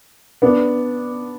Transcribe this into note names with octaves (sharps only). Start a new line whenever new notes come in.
B3 D4